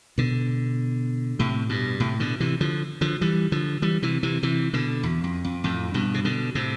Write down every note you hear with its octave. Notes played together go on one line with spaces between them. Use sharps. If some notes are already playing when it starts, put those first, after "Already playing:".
B2 D3
A2 C3
G2 B2
A2 C3
B2 D3
C3 E3
D3 F3
D3 F3
E3 G3
D3 F3
E3 G3
C3 E3
C3 E3
C3 E3
B2 D3
E2
F2
F2
F2 A2
G2 B2
C3
B2 D3
A2 C3